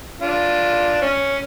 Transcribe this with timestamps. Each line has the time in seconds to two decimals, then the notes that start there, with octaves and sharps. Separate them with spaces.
0.21 D4 F4
1.02 C#4